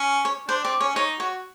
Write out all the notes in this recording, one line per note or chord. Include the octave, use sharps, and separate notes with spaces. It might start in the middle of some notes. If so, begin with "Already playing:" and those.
Already playing: C#4
C#5
D4 C5
C4 D5
C#4 C#5
D#4 C#5
F#4 C#5